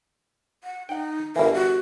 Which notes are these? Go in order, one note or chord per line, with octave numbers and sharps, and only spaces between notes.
F#5
D#4 F#5 G5
G1 E3 A#4
F#4